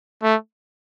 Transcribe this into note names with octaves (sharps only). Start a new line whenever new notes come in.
A3